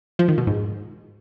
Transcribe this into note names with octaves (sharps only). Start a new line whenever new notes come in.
F3
D#3
B2
G#2